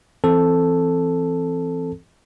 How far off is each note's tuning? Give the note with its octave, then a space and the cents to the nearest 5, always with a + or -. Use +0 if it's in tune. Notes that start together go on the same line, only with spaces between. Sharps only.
E3 +20 C4 +0 A4 +0